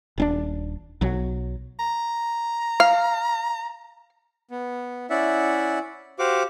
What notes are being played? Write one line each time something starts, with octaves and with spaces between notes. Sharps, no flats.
D#1 C#4 D4
B1 F#3
A#5
F5
B3
C#4 E4 D5 E5 F#5
F#4 G4 C5 F5 F#5 D6